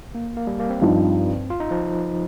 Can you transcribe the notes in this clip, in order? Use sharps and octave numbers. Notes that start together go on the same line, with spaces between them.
A#3
A#3
G3
A#3
C4
G2 F3 D#4
F4
D#4
F3